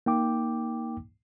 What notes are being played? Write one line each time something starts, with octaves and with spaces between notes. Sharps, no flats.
A#3 D#4 G5 D6